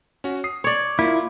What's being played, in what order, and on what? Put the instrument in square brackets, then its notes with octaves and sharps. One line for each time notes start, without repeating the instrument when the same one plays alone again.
[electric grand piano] C#4 F#4
D#6 C7
[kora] C#5 D5
[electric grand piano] A#3 F4 [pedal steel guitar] E4